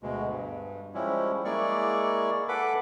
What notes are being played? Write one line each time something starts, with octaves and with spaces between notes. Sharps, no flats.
D2 B2 G#3
G2
F3 G3 G#3 C#4 E4
G#3 A#3 E4 G#4 D5 C#6
A4 B4 F#5 B5 D6